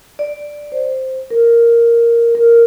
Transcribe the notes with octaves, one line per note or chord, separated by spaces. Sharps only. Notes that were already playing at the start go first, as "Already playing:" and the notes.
D5
C5
A#4
A#4